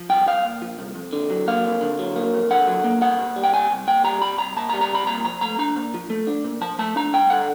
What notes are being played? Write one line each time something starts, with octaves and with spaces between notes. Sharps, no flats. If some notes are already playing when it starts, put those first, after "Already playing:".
Already playing: F3
C2 G5
C2 F5
A#2
F3
C2
F2
D3
F#3
A#3 F5
F2
D3
F#3
A#3
F2
D3 F#5
F#3
A#3
C2 F#5
A#2
G3
G5
C2 G#5
C2
A#2 G5
G3 A#5
C2 B5
C2 A#5
A#2 A5
A#5
G3
A#5
C2 B5
A#2 A#5
F3 A#5
A3 A#5
D4 A#5
A#2
F3
A3
D4
A#2
F3 A5
A3 A5
D4 A#5
G2 G5
D3 F#5